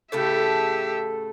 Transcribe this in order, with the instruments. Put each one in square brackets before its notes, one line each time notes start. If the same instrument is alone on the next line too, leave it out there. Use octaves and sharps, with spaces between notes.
[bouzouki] A2 C#3 A3 [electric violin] G4 E5 [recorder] A4